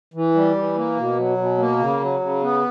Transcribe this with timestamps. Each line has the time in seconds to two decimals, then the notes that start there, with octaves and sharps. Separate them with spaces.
0.14 E3
0.35 G3
0.56 E3
0.76 A#3
0.97 B2
1.17 F#3
1.37 B2
1.58 A#3
1.79 C#3
2.00 F#3
2.20 C#3
2.42 B3